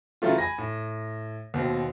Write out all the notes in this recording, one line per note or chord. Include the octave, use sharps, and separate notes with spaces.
C#3 E3 F#3 A3 F4
G#5 B5 A#6
A2
D#2 B2 C4